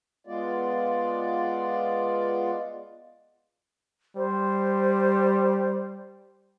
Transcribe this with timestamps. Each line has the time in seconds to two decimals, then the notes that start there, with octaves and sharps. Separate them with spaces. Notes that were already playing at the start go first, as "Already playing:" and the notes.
0.27 G#3 B3 F4 D5
4.16 G3 C5